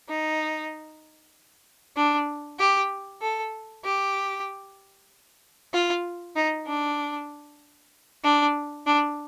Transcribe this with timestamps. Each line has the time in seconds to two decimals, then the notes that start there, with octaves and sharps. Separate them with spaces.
0.08 D#4
1.96 D4
2.59 G4
3.22 A4
3.84 G4
5.73 F4
6.35 D#4
6.67 D4
8.24 D4
8.86 D4